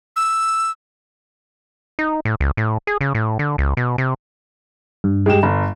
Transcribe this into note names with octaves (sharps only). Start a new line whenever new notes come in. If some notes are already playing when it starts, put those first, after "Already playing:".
E6
D#4
A2
C#2
A2
G#4
C#3
A2
D3
C#2
B2
C3
G2
G#3 G4 E7
G1